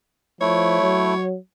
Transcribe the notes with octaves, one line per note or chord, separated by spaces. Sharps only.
F3 A3 E4 C#5
F#3